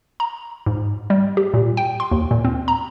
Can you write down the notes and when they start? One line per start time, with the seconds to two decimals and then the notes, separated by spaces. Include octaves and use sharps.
0.20 A#5
0.66 G#2
1.10 G3
1.37 G4
1.54 A#2
1.77 G5
2.00 C6
2.11 D#2
2.31 A#2
2.45 C4
2.68 A#5